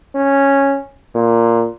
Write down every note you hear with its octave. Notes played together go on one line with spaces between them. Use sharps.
C#4
A#2